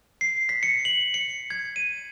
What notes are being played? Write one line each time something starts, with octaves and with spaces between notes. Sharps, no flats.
C7
B6
C#7
F#7
C#7
G#6
D#7